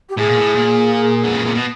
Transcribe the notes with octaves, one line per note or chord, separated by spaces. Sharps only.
G4
A2 G#4
A#2
A2
A#2
D3
C#3
C3
B2